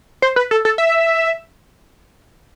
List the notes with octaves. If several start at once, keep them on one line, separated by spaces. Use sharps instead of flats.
C5
B4
A4
A4
E5